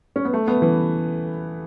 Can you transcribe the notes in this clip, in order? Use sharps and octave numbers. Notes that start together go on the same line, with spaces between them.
C#4
B3
A3
B3
E3